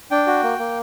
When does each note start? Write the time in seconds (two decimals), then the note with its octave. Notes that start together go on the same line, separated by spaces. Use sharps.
0.11 D4 G5
0.27 F#4
0.43 A#3
0.59 A#3